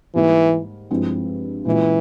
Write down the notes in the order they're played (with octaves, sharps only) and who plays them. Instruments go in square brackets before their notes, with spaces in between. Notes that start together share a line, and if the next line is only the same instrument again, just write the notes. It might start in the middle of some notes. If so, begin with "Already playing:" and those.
[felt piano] G#2 G3 A#3 [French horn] E3
[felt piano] G2 F3 G#3 C4 E4
[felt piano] A#2 G#3 C#4 F4 [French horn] E3